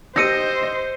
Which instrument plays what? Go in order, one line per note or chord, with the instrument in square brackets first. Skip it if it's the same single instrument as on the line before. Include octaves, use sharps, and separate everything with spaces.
[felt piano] G4 E6 A#6 [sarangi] C5 [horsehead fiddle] D#5 [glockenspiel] G6 C#7 D#7